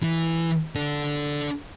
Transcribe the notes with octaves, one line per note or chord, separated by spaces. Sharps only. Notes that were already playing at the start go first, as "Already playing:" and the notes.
E3
D4 A4